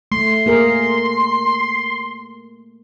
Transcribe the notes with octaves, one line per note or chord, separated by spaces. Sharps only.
A3 C6
A#3 G#4 A#4